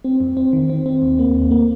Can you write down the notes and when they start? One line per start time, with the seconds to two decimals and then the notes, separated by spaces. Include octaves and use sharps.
0.04 C4
0.20 F2
0.37 C4
0.53 D#3
0.70 C4
0.86 C4
1.02 D#2
1.19 A#3
1.35 D#2
1.51 A#3